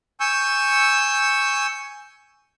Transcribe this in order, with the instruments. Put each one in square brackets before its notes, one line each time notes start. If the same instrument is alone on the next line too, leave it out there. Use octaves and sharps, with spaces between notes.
[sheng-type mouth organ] G#5 C#6 E6 G6